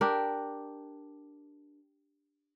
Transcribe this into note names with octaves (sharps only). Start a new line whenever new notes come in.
D4 G4 A#4